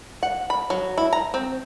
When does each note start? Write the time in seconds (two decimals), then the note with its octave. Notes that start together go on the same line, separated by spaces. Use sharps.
0.23 F#5
0.50 B5
0.70 F#3
0.98 E4
1.13 A#5
1.34 C4